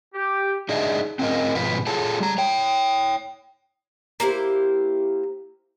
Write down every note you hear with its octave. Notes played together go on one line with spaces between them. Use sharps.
G4
D4 D#4 G#4 D#5 E5
C4 C#4 F4 A#4 D#5
G#2 B2 F3 F4 B4
F4 G#4 A4 C#5 A5
G3 A#5
C#5 G5
A#3 E4 G4 C5